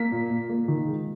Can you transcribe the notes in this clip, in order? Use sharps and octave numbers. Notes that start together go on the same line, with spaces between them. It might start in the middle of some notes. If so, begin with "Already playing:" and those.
Already playing: A#3 B6
A#2
A#2
A#3
D#3
G#3